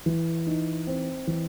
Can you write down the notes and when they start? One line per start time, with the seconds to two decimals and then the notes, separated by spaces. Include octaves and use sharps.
0.06 E3
0.47 D#4
0.87 C4
1.27 E3